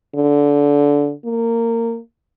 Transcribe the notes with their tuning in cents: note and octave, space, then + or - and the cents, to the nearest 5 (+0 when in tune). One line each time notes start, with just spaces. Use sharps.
D3 -20
A#3 -20